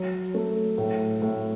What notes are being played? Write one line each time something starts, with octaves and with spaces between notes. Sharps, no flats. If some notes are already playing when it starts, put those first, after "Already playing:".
Already playing: F#3
A3
A2
A2